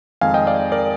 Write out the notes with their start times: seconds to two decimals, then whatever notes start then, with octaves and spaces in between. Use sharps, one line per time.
0.21 F2 D#3 G#3 F5 G#5
0.34 D#5 G5
0.47 D5 F5
0.72 A#4 D5